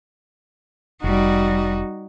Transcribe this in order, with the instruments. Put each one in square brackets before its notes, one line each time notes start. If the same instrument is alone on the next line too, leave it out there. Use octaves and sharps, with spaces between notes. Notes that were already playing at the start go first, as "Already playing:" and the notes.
[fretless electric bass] F1 [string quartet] G3 [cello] D#4 F#4